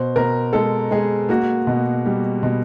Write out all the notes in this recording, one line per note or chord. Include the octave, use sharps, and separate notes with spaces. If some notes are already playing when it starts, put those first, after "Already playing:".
Already playing: B2 C5
B2 A#4
G#3 A4
G#3 G#4
A#3 F#4
B2
G3
B2